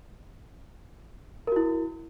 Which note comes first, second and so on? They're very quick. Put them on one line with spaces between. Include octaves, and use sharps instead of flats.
A#4 F#4 E4